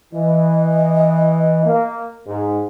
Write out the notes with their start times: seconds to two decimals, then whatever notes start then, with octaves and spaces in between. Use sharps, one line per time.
0.14 E3 D#5
1.65 A#3
2.27 G#2